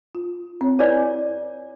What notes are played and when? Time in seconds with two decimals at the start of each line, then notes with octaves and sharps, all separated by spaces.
0.15 F4
0.61 C4 C#5
0.79 E4 B4 C#5 D5 G#5